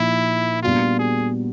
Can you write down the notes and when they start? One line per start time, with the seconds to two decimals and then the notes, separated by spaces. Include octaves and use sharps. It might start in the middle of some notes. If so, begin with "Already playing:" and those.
Already playing: A#2 F3 A#3 D#4 E4
0.63 A#2 G3 B3 D4 F4 F#4
0.99 G#4